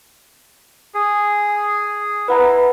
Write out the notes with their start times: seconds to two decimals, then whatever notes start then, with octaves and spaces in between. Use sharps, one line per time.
0.94 G#4
2.28 E4 B4 F#5 A#5